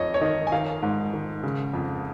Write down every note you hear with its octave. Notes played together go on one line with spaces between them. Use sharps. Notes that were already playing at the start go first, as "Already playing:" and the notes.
Already playing: F2 C#5 D#5
C#5
D#3 D#5
G#5
D#3 F5
G#2
D#3
C#3
F2